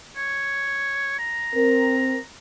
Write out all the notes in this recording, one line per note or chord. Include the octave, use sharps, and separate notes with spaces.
C#5
A#5
C4 A#4